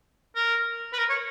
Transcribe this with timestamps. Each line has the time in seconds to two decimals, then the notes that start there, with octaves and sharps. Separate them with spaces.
0.36 A#4
0.93 B4
0.98 A#4
1.10 C#5